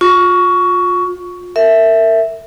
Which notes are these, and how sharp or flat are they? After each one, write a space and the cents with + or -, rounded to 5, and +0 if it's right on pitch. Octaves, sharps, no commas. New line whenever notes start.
F4 +30 C#6 +15
A#4 -30 E5 +0